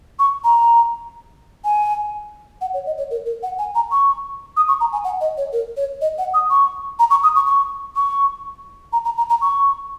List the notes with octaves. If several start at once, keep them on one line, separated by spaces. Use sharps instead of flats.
C#6
A#5
G#5
F#5
C#5
D#5
C#5
A#4
A#4
F#5
G#5
A#5
C#6
D#6
C#6
A#5
G#5
F#5
D#5
C#5
A#4
C#5
D#5
F#5
D#6
C#6
A#5
C#6
D#6
C#6
C#6
C#6
A#5
A#5
A#5
A#5
C#6